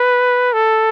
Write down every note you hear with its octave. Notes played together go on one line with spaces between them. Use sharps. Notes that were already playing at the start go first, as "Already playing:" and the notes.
Already playing: B4
A4